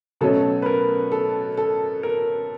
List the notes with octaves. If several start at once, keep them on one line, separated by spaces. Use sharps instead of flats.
B2 F#3 A3 C#4 A4
B4
A#4
A4
A4
A#4